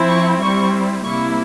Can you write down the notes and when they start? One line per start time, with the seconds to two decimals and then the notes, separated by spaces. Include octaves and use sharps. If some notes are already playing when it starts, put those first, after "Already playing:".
Already playing: F3 C4 E4
0.09 C#6
0.40 G3 C4 E4 C#6
1.04 C3 G3 A#3 E4 C#6